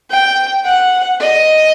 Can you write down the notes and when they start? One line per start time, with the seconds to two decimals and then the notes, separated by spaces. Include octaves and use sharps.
0.10 G5
0.65 F#5
1.20 D#5